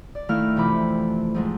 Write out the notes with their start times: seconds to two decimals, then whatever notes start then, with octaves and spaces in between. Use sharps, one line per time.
0.15 D5
0.29 D#3 A3 E4 F5 F6
0.56 F2 C3 E3 B5 D6
1.34 F2 G#2 G#3